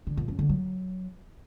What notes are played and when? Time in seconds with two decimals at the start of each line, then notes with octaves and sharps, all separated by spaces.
0.07 D3
0.17 A#2
0.28 F#2
0.39 D3
0.49 F#3